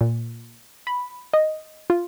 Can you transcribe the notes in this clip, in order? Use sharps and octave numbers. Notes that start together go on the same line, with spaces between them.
A#2
B5
D#5
F4